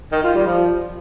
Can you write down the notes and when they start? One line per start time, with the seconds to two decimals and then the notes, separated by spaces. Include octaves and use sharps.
0.12 D#3
0.23 F4
0.35 G3
0.46 F3